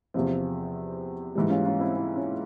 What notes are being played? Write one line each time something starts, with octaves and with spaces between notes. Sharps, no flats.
E2 C3 F3 C4
G#2 E3 G3
C#4 F4
C#4 F4
C4 E4
C4 E4
C#4 F4